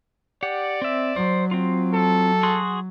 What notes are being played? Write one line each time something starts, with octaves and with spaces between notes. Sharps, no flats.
G4 D5 F#5
C4 E5
F#3 C5
C4 F4
A4
F#4 G#4 C6